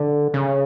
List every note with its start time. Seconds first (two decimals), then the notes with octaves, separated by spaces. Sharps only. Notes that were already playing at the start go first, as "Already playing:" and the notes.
Already playing: D3
0.34 C#3